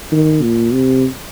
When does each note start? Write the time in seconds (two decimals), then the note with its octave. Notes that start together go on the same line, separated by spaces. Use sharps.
0.12 D#3
0.43 A#2
0.73 C3